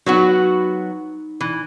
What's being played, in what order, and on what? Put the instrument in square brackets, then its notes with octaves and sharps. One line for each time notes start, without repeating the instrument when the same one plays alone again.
[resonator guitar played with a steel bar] F#3 B3 F#4 [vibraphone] D#4
[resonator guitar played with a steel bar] E3